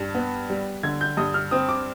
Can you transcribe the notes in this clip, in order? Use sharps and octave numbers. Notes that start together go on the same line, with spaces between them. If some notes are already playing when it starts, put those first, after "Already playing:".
Already playing: G2
B3
G3
D3 G#6
G6
G2 D#6
F6
C4 D#6
D6